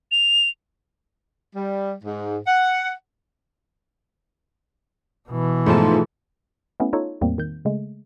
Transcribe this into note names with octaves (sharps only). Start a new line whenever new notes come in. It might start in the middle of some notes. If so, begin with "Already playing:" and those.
F7
G3
G#2
F#5
B2 E3
G#2 F3 A3 B3 D#4 F4 A5
A3 B3 C#4 E4
D#4 F4 A4 C#5
E2 A2 G3 A#3 C4
D#3 G6
C#3 G#3 A3